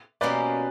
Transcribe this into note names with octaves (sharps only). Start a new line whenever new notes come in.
B2 A#3 C#4 G4 B4 D5